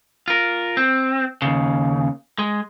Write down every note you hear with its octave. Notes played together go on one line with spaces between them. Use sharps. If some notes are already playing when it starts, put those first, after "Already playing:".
F4 A#4
C4
D#2 C#3
G#3